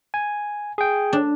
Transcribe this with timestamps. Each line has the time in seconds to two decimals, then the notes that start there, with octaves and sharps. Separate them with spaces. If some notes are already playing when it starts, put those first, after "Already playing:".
0.14 G#5
0.78 G#4 G5
1.13 D4